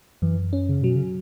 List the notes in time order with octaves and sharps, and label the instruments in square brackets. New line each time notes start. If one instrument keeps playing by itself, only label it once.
[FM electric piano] F#2 [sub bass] E3
[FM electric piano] C#4
[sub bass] C#3
[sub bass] B2 [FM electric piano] F#3
[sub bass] C#3